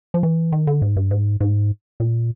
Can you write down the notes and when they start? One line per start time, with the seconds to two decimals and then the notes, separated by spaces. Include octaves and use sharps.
0.14 F3
0.23 E3
0.52 D#3
0.67 D3
0.82 G#2
0.96 G2
1.11 G#2
1.40 G#2
2.00 A#2